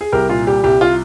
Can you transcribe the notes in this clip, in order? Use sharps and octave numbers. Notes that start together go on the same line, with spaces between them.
G#4
C2 G4 A#4
A#2 F4
G3 G4
C2 G4
F4